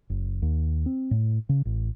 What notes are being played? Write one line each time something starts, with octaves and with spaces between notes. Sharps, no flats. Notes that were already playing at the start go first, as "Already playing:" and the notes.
F#1
D#2
C4
A2
C#3
A1